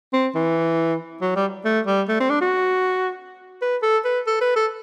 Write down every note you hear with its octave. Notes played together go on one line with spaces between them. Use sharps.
C4
E3
F#3
G3
A3
G3
A3
C4
D4
F#4
B4
A4
B4
A4
B4
A4